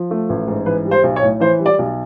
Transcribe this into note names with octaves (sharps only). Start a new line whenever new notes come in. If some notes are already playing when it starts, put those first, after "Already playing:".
Already playing: F3
A3
A1
G#2
E3 B4
G3
C5
B1
C#5
A2
E3 C5
G3
D5
B1